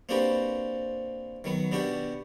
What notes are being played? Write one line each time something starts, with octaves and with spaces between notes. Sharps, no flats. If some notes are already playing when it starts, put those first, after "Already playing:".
A#3 C4 D4 F#4 G4 B4
D#3 F#3 B3
B2 B3 D4 F#4 G4